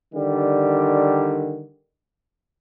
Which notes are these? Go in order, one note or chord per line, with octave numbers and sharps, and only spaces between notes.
D3 D#3 G3